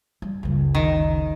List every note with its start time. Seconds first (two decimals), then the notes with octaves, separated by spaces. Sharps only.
0.22 G3
0.43 F#1 C#2
0.75 D#3